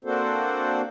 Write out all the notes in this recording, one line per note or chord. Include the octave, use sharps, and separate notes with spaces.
A#3 C4 D4 F#4 A4 C5